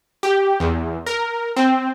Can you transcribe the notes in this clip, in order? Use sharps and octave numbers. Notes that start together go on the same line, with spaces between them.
G4
E2
A#4
C4